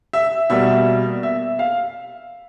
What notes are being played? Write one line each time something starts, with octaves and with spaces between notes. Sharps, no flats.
E5
B2 G3 A#3 E5
E5
F5